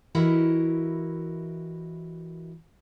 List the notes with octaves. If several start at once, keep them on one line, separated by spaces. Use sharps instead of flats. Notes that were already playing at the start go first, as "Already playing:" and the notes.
E3 E4 F#4 G4 A#4 D#5